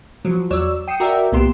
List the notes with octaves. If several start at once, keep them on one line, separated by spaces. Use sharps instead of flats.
F3 F#3
E2 F#3 C#5 D5 E6
G5 D#6 C7 C#7 D#7 E7
F#4 A#4 D5 E5 G5
C2 A#2 B3 G4 C6 E7